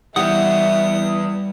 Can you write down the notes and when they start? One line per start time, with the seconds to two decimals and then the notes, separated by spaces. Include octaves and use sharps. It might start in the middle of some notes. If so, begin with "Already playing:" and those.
0.16 E3 G3 B3 E5 F#5 D#6